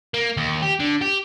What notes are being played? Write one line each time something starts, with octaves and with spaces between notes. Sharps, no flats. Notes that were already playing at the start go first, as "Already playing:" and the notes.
A#3
D#2
G4
D3
G4